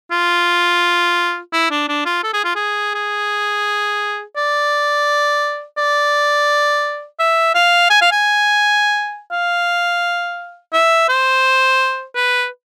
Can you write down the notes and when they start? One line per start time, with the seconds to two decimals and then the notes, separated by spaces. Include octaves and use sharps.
0.11 F4
1.53 E4
1.71 D4
1.88 D4
2.06 F4
2.23 A4
2.34 G#4
2.44 F4
2.55 G#4
2.95 G#4
4.37 D5
5.78 D5
7.19 E5
7.55 F5
7.90 G#5
8.01 F5
8.12 G#5
9.31 F5
10.73 E5
11.09 C5
12.15 B4